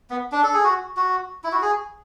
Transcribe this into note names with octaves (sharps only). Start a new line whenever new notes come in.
B3
D4
A4
G#4
F#4
F#4
E4
F#4
G#4